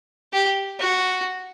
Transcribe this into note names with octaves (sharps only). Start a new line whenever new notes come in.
G4
F#4